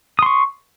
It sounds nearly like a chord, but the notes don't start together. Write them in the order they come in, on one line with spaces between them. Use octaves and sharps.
D#6 C6 C#6